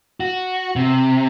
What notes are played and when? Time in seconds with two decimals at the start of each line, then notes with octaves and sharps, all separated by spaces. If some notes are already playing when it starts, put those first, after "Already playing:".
0.20 F#4
0.76 C3